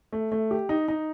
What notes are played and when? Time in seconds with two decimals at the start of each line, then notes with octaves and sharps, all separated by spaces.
0.13 A3
0.32 A3
0.51 G4
0.69 D#4
0.88 D#4